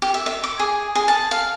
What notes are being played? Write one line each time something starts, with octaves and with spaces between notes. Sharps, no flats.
G4
E5
E5
D6
G#4
G#4
A5
F5